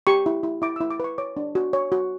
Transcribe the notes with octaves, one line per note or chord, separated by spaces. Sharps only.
G4 C#6
E4
E4
E4 D6
E4 E6
D6
B4 C#6
C#5 D6
D4
F#4
C#5
F#4